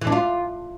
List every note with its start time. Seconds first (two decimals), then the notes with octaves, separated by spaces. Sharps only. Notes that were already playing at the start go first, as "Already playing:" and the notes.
0.02 E3
0.07 D4
0.12 F4